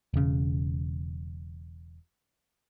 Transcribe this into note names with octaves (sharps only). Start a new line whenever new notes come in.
E1 C#3